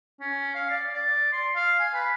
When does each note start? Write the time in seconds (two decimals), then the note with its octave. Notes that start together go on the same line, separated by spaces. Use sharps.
0.21 C#4
0.55 F5
0.70 D5
0.94 D5
1.33 C6
1.56 F5
1.79 G#5
1.94 B4